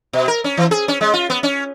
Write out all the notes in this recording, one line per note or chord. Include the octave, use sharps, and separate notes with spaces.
B2
A#4
C#4
E3
G#4
C#4
G#3
F4
B3
C#4